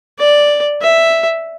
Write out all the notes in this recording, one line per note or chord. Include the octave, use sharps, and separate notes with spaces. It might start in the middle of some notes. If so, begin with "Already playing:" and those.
D5
E5